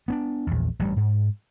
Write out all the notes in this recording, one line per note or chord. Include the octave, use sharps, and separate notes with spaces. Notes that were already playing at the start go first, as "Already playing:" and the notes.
B3 C#4 D4
A#1 E2
A1 G2 G3
G#2